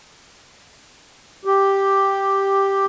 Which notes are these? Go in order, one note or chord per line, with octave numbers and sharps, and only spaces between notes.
G4